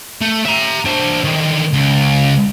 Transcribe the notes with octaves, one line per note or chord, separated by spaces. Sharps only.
A3
E5 A#5
D4 C5
D3 D#3
C#2